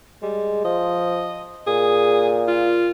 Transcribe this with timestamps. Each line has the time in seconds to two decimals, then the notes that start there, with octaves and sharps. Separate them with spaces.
0.22 G3 G#3
0.65 F3 D#5
1.67 A#2 G#4
2.48 F4